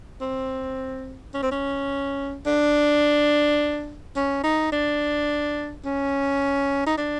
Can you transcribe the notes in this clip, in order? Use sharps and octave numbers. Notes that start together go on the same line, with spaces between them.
C4
C#4
C4
C#4
D4
C#4
D#4
D4
C#4
D#4
D4